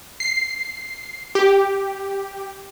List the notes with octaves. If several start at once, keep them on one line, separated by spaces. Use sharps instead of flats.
C7
G4